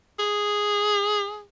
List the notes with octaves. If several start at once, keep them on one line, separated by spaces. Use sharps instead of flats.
G#4